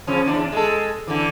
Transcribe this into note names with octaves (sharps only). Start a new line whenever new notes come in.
C#3 F3 C#4
E2 D4
G#3 A4
D3 E3